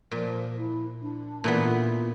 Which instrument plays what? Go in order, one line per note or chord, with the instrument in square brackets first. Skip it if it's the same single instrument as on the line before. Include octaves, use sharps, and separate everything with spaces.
[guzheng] A#2 [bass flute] F3
[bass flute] E4
D4
[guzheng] A#2 E3 B3
[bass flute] F4